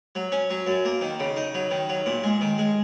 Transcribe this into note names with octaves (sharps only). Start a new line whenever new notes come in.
F#3
C#4
F#3
F#2
A#3
D#3
C#3
D#4
F#3
D#3
F#3
A#2
G#3
D#3
G#3